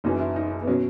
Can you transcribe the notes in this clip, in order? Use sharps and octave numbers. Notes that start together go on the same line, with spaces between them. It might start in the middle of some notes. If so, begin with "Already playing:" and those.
F#1 F#2 E3 D#4
E4
D#4
D#4
B3
B2 F#3 C#4